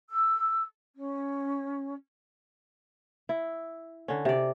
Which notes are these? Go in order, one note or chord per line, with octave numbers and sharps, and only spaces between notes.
E6
C#4
E4
D3 C#4
C3 D5